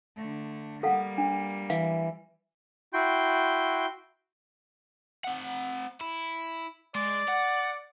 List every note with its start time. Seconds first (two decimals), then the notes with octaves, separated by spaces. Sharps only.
0.16 D3 A3
0.83 G3 A#3 A4 F5 F#5
1.18 D4
1.70 E3 F5
2.93 E4 F#4 G5 C6 G6
5.24 C4 F#5
6.01 E4
6.95 G#3 D5
7.28 F#5